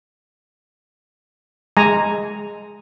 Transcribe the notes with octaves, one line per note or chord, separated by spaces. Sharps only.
G#3 G#5 A#5